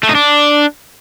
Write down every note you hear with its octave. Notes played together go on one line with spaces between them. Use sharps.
A3
D#4
D4